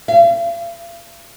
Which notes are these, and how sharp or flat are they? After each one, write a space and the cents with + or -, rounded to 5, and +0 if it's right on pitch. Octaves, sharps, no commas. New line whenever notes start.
F5 -45